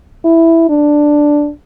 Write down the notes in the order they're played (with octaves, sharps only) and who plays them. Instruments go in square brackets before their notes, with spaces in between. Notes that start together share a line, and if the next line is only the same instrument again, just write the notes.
[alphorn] E4
D4